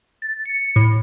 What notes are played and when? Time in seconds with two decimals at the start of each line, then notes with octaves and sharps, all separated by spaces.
0.22 A6
0.45 C#7
0.76 A2